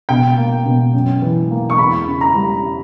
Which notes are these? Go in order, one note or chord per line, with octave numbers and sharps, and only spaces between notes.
B2 G5
A#3
B2
F#2
E3
A#3
C#6
E2 B5
C#3
A#5
G3